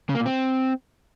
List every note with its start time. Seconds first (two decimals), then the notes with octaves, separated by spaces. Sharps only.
0.09 C#3
0.15 A#3
0.20 A#2
0.26 C4